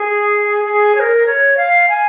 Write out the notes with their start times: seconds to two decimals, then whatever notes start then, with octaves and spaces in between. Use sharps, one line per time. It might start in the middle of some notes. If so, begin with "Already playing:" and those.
Already playing: G#4
0.64 G#4
0.95 C#5
1.00 A#4
1.26 C#5
1.57 F5
1.89 G#5